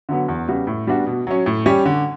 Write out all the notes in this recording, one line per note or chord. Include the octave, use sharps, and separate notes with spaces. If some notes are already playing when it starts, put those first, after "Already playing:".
D3 F#3 B3
E2
C#3 G3 B3 F#4
A2
G3 B3 D4 F#4
B2
F#3 C#4
A2
G3 C#4 G4 C#5
D3